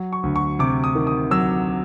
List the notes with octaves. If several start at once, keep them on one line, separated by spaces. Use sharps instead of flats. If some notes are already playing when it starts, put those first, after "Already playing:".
Already playing: F#3
C#6
D2
C#6
C3 D6
D#6
D#3
D#6
F#3 E6